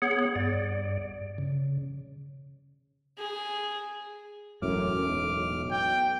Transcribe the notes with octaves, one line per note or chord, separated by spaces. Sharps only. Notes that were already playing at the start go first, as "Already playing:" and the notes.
B3 G#4 C#5 F#5
G2 D5
C#3
G#4
E1 F#2 A2 D6 F6
B1
G5